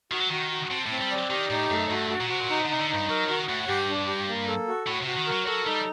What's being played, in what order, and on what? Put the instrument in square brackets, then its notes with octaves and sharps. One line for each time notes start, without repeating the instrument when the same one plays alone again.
[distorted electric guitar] D#3 [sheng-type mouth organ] F#4
[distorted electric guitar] F#3
[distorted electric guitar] D#3 [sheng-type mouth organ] F#4
[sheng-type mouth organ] F#4
[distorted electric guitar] C3 [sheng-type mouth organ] A5
[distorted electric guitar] A2 [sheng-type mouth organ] C4
[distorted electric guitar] G3
[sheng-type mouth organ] D5
[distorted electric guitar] D#3 [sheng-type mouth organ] G4
[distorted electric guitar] A2 [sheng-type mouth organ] D#4
[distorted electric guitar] F#2 [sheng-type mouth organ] A3
[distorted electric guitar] G2 [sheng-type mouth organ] F#4
[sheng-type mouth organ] F#4
[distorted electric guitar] A#2
[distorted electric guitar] C3 [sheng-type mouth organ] F#4
[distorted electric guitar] A#2
[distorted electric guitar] C3 [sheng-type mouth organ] D#4
[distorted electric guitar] D3
[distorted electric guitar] C3 [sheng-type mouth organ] D#4
[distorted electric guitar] D3
[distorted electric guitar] G2 [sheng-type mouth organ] D#4
[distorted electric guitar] F#3 [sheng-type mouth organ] A#4
[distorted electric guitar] D#3 [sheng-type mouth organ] F#4
[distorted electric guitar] A2 [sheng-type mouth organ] F#5
[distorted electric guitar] G2 [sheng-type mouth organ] G4
[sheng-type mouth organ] D4
G4
A#3
A4
F#4
[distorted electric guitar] A2 [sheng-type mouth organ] F#4
[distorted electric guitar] C3 [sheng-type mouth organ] F#4
[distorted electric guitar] D#3
[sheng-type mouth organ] A#4
[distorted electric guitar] F#3
[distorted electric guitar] F#3 [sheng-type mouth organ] A4
[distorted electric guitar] G3 [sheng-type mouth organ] D#4